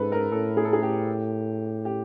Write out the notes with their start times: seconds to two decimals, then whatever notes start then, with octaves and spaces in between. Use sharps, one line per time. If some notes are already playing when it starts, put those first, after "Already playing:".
Already playing: G#2 A4 B4
0.12 A#4
0.31 A2 A4
0.57 G#4
0.65 A4
0.73 G#4
0.82 G4
1.85 G4